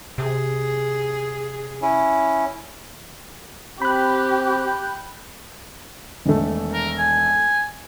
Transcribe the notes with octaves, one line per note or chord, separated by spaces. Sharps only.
C3 G#4
C#4 E4
C4 G4 G5 B5 F#6
E1 D#3 A3
A#4
G#5